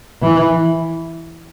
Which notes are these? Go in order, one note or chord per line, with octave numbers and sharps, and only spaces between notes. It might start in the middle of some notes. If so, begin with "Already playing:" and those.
E3